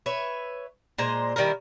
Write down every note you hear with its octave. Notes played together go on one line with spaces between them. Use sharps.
B4 C#5 E5
A#2 G#3 C5 A#5
D#3 G3 E4 A#4